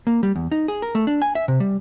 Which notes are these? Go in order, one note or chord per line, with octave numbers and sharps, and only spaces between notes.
A#3
G3
E2
D#4
G#4
A#4
A3
D4
G#5
E5
C3
G3